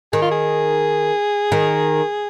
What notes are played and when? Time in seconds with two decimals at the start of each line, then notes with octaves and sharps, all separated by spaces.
0.13 D#3 G#4
0.22 F4
0.31 G#4
1.52 D#3